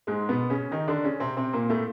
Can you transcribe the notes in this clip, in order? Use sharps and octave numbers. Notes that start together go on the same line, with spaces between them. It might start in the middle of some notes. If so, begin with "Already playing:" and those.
G#2 G#3
B2 B3
C#3 C#4
D#3 D#4
D3 D4
C#3 C#4
C3 C4
C3 C4
A#2 A#3
A2 A3